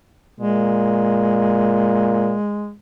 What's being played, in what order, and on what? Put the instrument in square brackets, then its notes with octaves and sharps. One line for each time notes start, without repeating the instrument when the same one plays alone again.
[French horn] A#2 [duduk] G#3